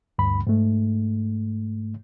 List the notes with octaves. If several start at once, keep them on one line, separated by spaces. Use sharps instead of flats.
D2 G2 B5
G#2 A3